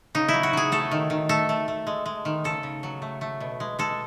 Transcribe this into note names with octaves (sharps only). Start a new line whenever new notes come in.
C#3 D#4
F#3 E4
F#4
F#3 G#4
A3 A4
D#3
D#3
A3 A4
A3
A3
G#3
G#3
D#3
C#3 A4
C#3
F#3
A3
A3
B2
G#3
G#3 A4